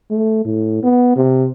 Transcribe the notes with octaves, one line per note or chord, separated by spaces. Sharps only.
A3
A2
B3
C3